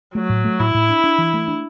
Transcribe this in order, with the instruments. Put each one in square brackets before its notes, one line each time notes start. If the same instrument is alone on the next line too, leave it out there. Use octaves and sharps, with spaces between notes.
[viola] F#3 [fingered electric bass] A3
[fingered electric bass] A2
A3
[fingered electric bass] A2 [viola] E4
[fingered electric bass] A2
D4
D4
E3
A3
D4